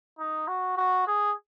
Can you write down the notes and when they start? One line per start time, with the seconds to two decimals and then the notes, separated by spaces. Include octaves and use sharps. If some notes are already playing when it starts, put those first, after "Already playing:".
0.19 D#4
0.48 F#4
0.78 F#4
1.07 G#4